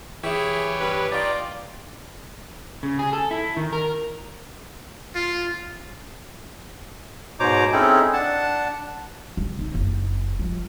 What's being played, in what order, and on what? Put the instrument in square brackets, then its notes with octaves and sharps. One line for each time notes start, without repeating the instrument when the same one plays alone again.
[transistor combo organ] E3 G4 C#5 [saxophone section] E4 G#4
[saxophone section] G2 B4
[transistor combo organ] D#4 G4 [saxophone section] F4 D5
[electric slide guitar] C#3
G#4
A4
E4
D#3
A#4
[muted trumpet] F4
[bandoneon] G#2 B2 C5 C#5 A#5 D6
C4 C#4 D#4 E4 G#4 A4
D4 F#5 A5
[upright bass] C#3
D#4
F#1
F3